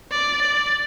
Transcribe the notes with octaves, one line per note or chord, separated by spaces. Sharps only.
D5
D5